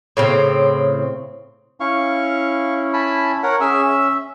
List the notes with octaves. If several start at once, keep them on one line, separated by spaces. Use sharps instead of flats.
A2 C#3 C4
C#4 E4 F5 C#6
G#5 A5 B5
A#4 C#5 F#5
C#4 G#4 E5 G#5 E6
E5